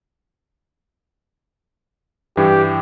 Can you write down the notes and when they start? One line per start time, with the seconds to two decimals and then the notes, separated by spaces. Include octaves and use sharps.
2.37 G2 E3 G4